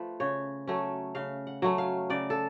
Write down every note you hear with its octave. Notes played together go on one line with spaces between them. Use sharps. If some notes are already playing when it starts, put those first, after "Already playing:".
Already playing: F3 A3 B4
C#3 C#5
F#3 A3 C#4
C#3 F5
F#5
F#3 A3 C#4
F5
C#3 D5
A4